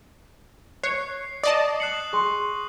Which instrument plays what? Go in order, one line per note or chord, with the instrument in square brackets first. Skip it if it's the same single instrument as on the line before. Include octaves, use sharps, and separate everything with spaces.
[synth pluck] C#5 [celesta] F#6 C#7 [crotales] C7
[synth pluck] D5 D#5 A5 [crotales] D#6
[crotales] F#6 C7 F#7 [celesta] C#7 E7
[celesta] G#4 G#5 C6 [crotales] C#6